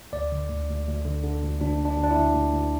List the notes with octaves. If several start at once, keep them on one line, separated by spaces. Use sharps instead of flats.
D2 D5
D3
D2
D2
D2
D3
D3
D2
D2 D4
D2
D4
D2
D4
E4
D2
D2
D2